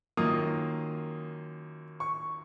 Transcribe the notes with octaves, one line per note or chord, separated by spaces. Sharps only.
F#2 D#3 A#3 F4 D#6
C#6